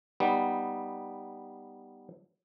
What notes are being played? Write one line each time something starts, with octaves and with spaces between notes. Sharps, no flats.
G3 B3 D#4